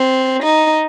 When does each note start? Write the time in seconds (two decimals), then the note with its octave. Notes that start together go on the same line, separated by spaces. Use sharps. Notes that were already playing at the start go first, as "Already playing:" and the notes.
Already playing: C4
0.41 D#4